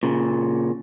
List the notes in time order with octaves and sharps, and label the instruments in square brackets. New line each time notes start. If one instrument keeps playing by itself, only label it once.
[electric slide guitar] A#2 C#3